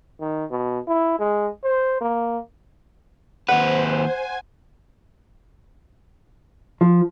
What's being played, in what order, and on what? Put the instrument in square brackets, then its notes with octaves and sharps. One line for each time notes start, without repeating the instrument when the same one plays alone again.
[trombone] D#3
B2
E4
G#3
C5
A#3
[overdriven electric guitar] D#2 B4 [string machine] C5 [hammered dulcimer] F#5
[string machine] G#5
[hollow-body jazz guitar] F3